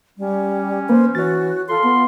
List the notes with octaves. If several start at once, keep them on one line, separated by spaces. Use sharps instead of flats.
G3 C#4
A#3 B4 C5
E3 F#4 C#5 A6
F4 A4 C6
B3